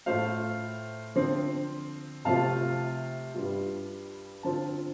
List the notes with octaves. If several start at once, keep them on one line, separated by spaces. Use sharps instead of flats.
A2 A3 F4 C5 F5
D3 F3 C4
C3 F3 A3 C4 F4 F5 A5
G2 G3 F4
D3 F3 C4 F4 A5